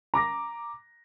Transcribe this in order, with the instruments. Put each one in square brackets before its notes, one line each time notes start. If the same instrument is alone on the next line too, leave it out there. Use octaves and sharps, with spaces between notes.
[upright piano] A#5 D6 A#6